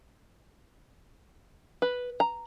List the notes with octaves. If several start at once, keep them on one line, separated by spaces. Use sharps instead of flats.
B4
A#5